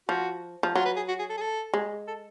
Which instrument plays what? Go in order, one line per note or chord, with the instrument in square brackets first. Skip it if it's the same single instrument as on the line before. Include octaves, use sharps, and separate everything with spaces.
[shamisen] F3 [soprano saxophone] F#4
[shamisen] F3
[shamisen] F#3 [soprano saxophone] F4
[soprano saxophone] B4
G#4
F#4
G#4
A4
G#4
A4
[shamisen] G#3
[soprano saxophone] A4